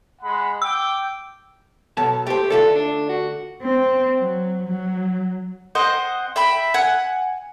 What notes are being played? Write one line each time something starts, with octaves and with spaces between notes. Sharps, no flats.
G#3 F#5 B5
G5 D6 E6
B2 F#3 A4 A5
A3 G4 C5
D3 A3 F4 A4
D4
F#4
C4
F#3
F#3
C4 C5 D#5 F#5
E5 G5 B5
F#5 G#5